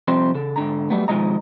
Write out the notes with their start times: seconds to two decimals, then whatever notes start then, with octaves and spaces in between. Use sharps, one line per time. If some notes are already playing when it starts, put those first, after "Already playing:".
0.08 C2 F3 C4 C5 C6
0.35 C#3 A4
0.56 G#2 D3 A#5
0.90 F#3 G3 A3 B3
1.08 B2 D#3 F3 G#3 D#5 A#5